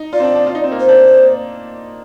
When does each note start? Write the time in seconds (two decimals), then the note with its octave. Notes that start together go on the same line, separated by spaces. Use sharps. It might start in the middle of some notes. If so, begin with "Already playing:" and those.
Already playing: D#4
0.13 F4 D5
0.20 C4
0.23 D4
0.35 D4
0.47 F4
0.55 D#4
0.64 C4
0.72 A#3
0.80 C5
0.89 D4